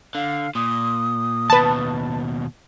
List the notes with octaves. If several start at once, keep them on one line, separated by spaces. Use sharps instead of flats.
D3 F5
A#2 D#6
D#2 B2 B4 A5